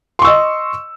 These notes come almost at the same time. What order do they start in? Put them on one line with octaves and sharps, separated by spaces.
C6 C#6 E6 D#5